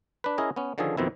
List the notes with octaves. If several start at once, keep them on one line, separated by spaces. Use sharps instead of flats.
D4 B4
C#4 E4 G#4 A#4 D#5
B3 C#4
D3 D#3 F3 C#4 G#4 A4
F2 B2 D#3 C4 E4